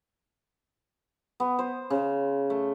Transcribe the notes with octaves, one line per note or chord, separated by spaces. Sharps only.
B3
C5
C#3
A3